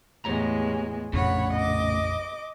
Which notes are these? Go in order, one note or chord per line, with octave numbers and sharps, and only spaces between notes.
E2 A2 G#3 G4 C#5 A#5
A#1 F2 A2 C#3 C#5 F#5 B5
D#5 D6